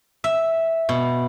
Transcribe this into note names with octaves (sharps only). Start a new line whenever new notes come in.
E5
B2